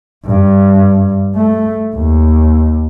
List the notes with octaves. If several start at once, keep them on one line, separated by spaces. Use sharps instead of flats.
G2
A3
D#2